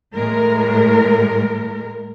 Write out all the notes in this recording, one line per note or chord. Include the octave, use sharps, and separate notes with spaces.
A2 G#3 A#4